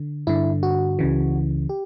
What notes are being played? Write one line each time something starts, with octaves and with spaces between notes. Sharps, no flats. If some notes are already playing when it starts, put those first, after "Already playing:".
Already playing: D3
G2 D3 E4
F#4
C#2 C#3 E3
G4